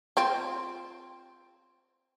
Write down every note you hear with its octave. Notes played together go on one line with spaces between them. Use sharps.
C4 F4